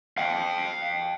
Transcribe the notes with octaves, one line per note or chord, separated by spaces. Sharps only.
F5 G5